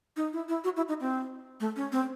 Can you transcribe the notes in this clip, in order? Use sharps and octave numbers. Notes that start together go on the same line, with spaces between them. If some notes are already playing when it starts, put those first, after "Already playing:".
D#4
E4
E4
F#4
E4
D#4
C4
A3
C#4
C4